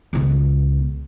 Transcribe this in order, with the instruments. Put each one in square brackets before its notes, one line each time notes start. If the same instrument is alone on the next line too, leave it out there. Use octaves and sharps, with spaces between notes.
[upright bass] C#2 B2